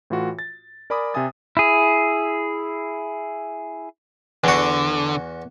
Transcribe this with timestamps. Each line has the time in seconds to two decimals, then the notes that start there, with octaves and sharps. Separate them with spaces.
0.10 A2 E3 F4 F#4
0.39 A6
0.90 A#4 D5 G#5 B5 D6 D#6
1.14 C3 C4 E5 G#5 D#6 A6
1.57 E4 G#4
4.44 E2 D3 F#4